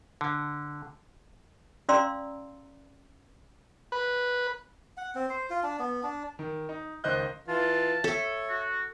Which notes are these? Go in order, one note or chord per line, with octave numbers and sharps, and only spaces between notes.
D3
C#4 D5 F5 A#5 C6 E6
B4
F#5
C4
C5
F4
D4
B3
D4
D#3
D#4
C#2 D#3 C5 D#5 F#6 G6
E3 F4 A5
A4 C#5 E5
F#4